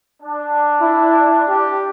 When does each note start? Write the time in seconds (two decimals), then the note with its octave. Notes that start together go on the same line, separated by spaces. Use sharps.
0.22 D4
0.82 E4
1.49 G4